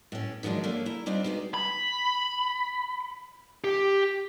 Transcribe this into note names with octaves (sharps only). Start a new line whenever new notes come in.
A2 C#4
D#3 F3 F#3 G#3 D4
A3 A#3 C#4 D4
E4 A#5
G3 C4 D4 D#4 F4
G#3 B3 D#4 F4 F#4
B5
G4